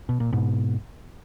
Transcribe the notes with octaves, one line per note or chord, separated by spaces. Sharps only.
B2
A#2
G#2 B2